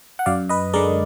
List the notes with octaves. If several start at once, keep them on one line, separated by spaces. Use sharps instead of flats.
F#5
F#2 D5 F5
B4 D#5
D3 G#3 A#4 D5